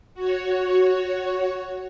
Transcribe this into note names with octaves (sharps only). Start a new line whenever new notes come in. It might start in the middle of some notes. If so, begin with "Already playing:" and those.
F#4 C#5